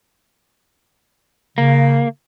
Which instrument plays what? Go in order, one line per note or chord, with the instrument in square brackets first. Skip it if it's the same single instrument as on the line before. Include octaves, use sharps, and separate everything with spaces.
[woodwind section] C#3 [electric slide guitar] A#3